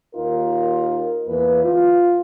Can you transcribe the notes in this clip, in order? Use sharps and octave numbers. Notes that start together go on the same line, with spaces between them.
D#2 D#4 F4 A#4
E2 A#3 B4
F4